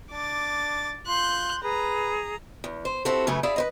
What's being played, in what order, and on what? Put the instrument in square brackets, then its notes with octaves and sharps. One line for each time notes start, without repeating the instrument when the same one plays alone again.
[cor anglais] D4 [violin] D6 A6
[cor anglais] F4 [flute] C6 [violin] F#6 G6
[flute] G#4 [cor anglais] B4 [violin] A#5
[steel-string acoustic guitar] E2
C5
C4 E4 F#4 G4 A4
F#2 C#3 A3 B4 G#5
E4 G#4 D5 E5 F5
B4 C5 D#5